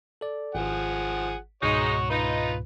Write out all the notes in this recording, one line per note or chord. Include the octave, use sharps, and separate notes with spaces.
A4 D5
G#1 F3 G#4 F#5
C#2 G#2 B2 G#3 D#4 F#4 C#5
D#4 F4 B4